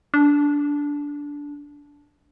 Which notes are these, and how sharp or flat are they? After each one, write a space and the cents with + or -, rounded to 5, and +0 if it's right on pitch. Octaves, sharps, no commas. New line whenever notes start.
D4 -15